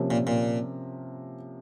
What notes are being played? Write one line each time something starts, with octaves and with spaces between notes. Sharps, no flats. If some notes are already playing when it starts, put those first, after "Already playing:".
Already playing: C3 F3 A#3 C#4
A#2
A#2